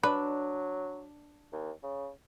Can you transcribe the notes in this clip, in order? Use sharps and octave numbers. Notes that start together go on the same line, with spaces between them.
F#3 D4 B4
D#2
C#3